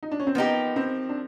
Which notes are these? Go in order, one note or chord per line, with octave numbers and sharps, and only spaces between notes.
D#4
D4
C#4
C4
F3 A#3 B3 D#4 G4
C4
D4